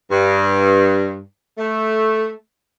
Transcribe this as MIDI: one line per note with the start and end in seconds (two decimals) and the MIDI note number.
0.11 1.20 43
1.58 2.31 57